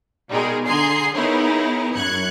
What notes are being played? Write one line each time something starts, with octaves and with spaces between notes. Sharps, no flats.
B2 G3 G#3 D#4 G#4 A#4
D3 G#4 G#5 A#5 C6 C7
B3 D#4 E4 G#4 A#4 C#5
F#2 F#6 G#6 C#7